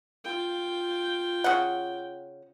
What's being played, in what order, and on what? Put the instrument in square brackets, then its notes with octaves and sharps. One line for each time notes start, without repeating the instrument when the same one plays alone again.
[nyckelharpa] F4 G5
[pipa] C#3 F#5